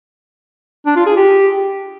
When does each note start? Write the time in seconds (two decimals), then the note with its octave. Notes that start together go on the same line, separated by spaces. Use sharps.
0.86 D4
0.96 F4
1.06 G#4
1.16 G4